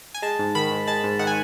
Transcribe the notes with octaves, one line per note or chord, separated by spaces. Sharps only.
G#5
G#3 A5
G#2
D#3 B5
G#2
G#3 A5
G#2
D#3 F#5
G#5